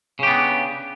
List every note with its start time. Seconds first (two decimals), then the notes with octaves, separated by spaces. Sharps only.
0.19 C#3
0.23 G4
0.27 B3
0.31 D4